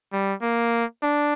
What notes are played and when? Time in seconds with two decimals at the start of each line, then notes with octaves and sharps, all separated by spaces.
0.13 G3
0.42 A#3
1.03 D4